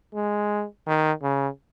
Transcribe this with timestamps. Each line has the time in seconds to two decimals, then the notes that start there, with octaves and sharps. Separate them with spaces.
0.14 G#3
0.87 D#3
1.23 C#3